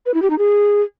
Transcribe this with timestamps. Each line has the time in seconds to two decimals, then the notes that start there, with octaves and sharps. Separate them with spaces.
0.06 B4
0.14 E4
0.22 G4
0.30 D#4
0.38 G#4